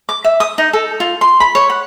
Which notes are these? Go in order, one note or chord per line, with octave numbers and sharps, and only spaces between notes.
D6
E5
D#6
D#4
A4
F4
C6
B5
C#5
F#5